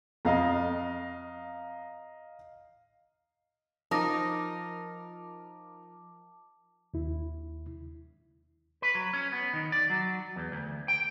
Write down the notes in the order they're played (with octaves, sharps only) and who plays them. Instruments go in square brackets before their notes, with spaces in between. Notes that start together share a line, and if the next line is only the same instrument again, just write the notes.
[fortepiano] F2 [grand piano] D#5 F5 A#5
[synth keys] F3 A#4 F6 [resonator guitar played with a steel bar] D#4 [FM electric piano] A5 D6 [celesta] D#6 A#6
[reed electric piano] D#2 E4
[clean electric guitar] B4
F#3
C#4
B3
D#3
D5
F#3
E2
D2
G5